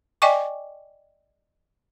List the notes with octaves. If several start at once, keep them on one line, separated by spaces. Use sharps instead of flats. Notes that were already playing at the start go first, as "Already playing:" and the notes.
D5 D#5 G5 G#5 C#6 D6